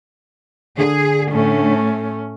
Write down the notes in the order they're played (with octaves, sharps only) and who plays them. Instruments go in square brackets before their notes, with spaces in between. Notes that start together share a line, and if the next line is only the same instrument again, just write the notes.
[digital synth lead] D3 [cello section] G#4
[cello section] A2 [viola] A3 C#4